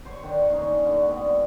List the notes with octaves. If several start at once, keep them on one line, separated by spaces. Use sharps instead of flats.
C5 C#5 F#5 C#6
D#3 D4 E4
A#3 C#4 D#4
D3 F#4 D5
G#2 B3 C4 E4